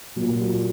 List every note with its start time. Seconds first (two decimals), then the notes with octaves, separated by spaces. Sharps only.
0.17 A#2 F#3
0.41 F#4